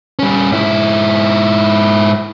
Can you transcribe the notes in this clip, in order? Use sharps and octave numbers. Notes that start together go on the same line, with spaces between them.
G3 C#4
G#2 E4